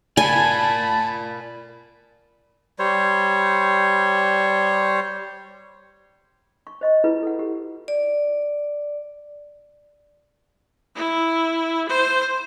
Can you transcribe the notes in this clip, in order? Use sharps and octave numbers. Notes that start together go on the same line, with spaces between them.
A#4 D5 G#5 A5 B5
G3 C5 C#5
C#6
C5 D#5 C#6
E4 F4 G#4 B4
A4 F#5
G4
D5
E4
C5